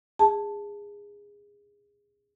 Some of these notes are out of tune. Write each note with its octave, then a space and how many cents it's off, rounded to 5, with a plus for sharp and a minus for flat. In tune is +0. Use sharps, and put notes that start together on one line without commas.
G#4 -20 A5 +0